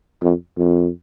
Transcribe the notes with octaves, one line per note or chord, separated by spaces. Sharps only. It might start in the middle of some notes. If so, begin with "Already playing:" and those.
F2
F2